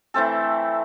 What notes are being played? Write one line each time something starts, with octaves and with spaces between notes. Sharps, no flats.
E3 A3 C4 A4